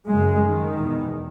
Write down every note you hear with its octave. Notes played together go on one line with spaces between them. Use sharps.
F#2 C#3 G#3
D#3
E2 B2